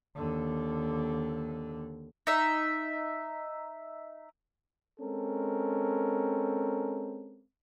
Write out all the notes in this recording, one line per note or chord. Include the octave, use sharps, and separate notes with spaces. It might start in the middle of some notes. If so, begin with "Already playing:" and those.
D#2 D3
D#4 E5
G#3 C4 C#4 A4 A#4